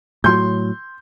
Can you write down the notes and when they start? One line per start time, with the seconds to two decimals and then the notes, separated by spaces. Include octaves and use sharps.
0.24 A2 F#3 C6 G6